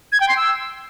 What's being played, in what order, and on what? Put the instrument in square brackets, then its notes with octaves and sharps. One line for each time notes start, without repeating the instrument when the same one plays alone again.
[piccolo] G#6
G5
C6
E6